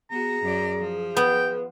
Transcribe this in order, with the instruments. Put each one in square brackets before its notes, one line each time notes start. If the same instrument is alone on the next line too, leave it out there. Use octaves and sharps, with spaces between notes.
[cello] B3 F#4 [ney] G#4 [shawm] A#5
[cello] F#2 D5
F3
[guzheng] B3 [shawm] G5